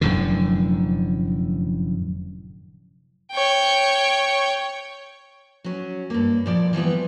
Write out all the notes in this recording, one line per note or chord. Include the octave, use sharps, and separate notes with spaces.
F1 F#2 A2 D3
C#5 G5
F#3 C#4
G2 A#3
A#2 F3 D5
E3 F3 G3 B3